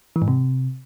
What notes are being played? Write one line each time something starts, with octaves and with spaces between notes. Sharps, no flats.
E3
G#2
C3